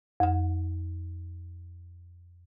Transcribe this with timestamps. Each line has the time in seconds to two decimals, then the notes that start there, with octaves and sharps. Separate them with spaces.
0.20 F2 F#5